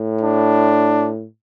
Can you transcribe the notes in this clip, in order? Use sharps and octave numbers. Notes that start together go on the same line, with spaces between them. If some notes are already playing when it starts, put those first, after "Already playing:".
Already playing: A2
D4